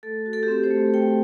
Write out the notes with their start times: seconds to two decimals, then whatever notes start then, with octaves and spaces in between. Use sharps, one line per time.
0.03 A3 A4
0.26 F#4
0.33 A4
0.43 G4
0.48 C4 A4
0.63 C5
0.71 A3
0.94 A3 G5